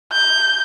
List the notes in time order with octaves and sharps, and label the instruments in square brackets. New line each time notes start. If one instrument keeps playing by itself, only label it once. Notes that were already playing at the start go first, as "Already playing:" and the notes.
[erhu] G6